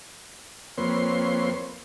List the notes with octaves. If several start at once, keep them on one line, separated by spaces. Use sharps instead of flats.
F2 A#3 C4 B4 C#5 C6